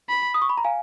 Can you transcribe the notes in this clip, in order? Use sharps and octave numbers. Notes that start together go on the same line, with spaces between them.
B5
D#6
C#6
B5
A#5
F5 G#5